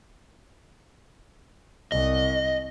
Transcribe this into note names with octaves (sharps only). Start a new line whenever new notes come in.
C2 D#5